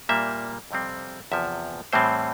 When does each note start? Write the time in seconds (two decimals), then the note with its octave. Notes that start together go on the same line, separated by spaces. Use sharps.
0.09 A#2 G3 A#3 E5
0.71 F2 C3 G3 C4
1.32 E2 C3 F3 E5
1.93 A2 E3 G3 C4 C5